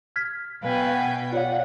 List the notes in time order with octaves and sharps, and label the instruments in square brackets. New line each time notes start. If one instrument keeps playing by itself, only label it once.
[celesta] F6 G#6 B6
[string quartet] B2 G5 [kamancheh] B4 G#5 [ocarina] F5
[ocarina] F#5
[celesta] F4 C#5 F5 [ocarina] D5 [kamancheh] F#5